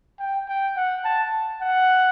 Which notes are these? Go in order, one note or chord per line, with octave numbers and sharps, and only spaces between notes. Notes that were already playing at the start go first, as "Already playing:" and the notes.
G5
G5
F#5
A5
F#5